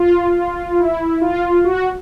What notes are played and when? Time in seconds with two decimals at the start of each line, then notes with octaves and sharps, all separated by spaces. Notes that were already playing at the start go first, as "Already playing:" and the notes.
Already playing: F4
0.79 E4
1.22 F4
1.65 F#4